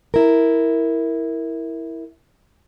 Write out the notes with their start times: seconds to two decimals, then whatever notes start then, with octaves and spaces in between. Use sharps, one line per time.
0.14 E4 A#4